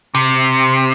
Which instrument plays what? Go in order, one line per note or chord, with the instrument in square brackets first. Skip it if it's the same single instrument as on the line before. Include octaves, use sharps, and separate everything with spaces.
[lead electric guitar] C3